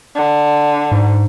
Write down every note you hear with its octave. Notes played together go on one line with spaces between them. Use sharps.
D3
G#2